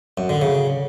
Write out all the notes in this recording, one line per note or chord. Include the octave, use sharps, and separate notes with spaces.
F#2
D3
C#3